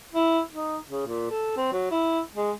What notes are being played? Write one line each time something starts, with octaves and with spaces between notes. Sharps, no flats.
E4
D#4
C#3
A#2
A4
C4
F#3
E4
G#3